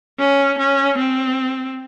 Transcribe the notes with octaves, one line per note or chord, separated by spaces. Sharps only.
C#4
C#4
C4